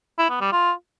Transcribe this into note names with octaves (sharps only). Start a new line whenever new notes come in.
E4
B3
G3
F4